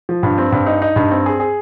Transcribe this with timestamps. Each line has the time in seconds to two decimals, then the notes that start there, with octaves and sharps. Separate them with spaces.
0.09 F3
0.23 G2
0.38 C4
0.52 G2
0.66 D#4
0.82 D#4
0.96 G2
1.11 C4
1.26 G#4
1.40 G#4